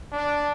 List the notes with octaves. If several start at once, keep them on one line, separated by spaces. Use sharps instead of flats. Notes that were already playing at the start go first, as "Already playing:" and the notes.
D4